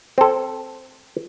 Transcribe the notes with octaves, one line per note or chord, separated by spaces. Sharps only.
C4 A4